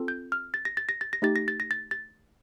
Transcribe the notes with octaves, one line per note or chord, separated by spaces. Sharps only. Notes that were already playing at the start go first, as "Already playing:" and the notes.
Already playing: C4 F4 A4
G6
F6
A6
A#6
A6
A#6
A6
A#6
A3 D#4 G4 A6
A#6
A6
A#6
A6
A6